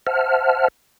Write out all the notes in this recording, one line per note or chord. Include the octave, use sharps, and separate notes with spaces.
C5 E5 F#5 A5 F6